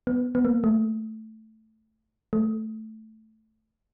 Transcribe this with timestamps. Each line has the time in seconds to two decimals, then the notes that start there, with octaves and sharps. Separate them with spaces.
0.07 B3
0.35 B3
0.45 A#3
0.64 A3
2.33 A3